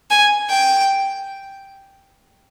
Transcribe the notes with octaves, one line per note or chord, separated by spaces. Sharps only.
G#5
G5